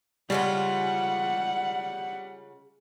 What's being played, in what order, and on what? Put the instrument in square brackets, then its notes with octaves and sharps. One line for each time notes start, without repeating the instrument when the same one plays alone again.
[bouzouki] C#3 G#3 F4 [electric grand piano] G3 [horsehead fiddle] F#5